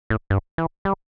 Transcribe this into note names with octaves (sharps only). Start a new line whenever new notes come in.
A2
G2
E3
G3